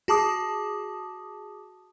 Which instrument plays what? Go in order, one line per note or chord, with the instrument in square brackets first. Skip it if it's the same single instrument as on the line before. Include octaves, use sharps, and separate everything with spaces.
[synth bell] F#4 G#4 A5 D6 D#6